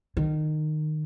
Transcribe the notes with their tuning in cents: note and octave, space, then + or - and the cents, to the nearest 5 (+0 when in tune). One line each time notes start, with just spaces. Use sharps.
D#3 -20